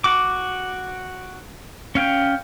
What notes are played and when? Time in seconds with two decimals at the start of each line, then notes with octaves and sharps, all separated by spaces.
0.04 F#4 D6
1.95 C#4 F5 G5